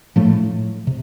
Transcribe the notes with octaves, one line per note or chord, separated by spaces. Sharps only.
A2 F3 A3
C3